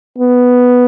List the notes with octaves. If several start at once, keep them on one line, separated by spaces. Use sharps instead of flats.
B3